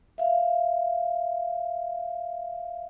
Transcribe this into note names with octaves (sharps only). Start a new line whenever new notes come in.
E5 F5